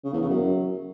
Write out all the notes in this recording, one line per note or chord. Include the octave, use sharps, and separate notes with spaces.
C#3
E2
C#3
F#2